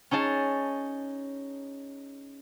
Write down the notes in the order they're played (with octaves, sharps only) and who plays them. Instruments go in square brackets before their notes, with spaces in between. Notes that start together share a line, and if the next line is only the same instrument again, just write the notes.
[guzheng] C#4 D#4 G#4 A5